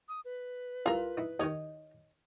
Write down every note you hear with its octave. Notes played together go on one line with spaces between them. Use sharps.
D#6
B4
C2 F4 A4 A#4
D#4 E4
D#2 D#3 C#5 D#5